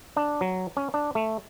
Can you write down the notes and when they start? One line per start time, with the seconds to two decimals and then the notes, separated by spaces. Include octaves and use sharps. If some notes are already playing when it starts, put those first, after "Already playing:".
0.16 D4
0.41 F#3
0.77 C#4
0.94 D4
1.15 A3